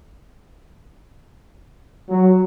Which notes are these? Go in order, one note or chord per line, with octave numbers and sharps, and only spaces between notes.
F#3